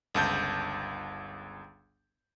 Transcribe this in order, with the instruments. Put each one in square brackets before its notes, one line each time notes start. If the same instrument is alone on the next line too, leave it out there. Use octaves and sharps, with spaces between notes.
[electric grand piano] G1 C#2 A5 G6